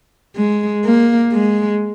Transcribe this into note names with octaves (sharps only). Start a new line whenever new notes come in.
G#3
A#3
G#3